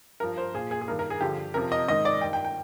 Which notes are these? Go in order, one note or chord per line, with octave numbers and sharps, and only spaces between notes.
G2 F3 A#4
C5
A#2 F3 G#4
G#4
G#4
G2 D#3 A#4
A#4
G#4
G2 D3 F3 G4
F2 C3 F3 A#4
D#5
G#2 D#3 D#5
D5
G2 D#3 G5
G5
G5